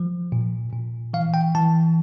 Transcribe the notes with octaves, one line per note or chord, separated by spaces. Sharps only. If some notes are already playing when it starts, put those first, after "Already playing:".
Already playing: F3
A#2
A#2
E3 F5
G5
E3 A5